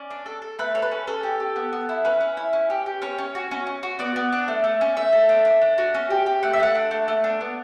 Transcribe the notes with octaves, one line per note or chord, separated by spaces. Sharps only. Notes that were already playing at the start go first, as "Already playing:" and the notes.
Already playing: C#4 D5
D4
A4
A4
A3 B4
A4 C#5
B4
C#4
C#4 A4
G4
G4
B3
B3
E4
C#4 B4
C#4
E4
C#4
G4
G4
C#4 C#5
C#4
F#4
C#4
C#4
F#4
B3 D5
B3
D4
A3
A3
C#4
A3 E5
A3
D4
D4
D4
F#4
C#4
G4
G4
A3 F#5
E5
A3 F#5
D4
A3
A3
D4
B3